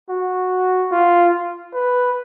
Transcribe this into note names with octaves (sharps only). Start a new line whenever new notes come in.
F#4
F4
B4